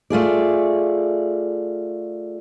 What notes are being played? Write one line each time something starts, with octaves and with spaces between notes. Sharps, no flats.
A3 F4 G#4 D5